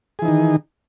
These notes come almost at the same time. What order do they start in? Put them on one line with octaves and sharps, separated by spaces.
G#4 E3 D#4 D#3